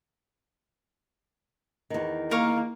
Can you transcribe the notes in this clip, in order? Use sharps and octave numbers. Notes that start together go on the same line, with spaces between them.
E2 D#3
A#3 A#4 F5 C#6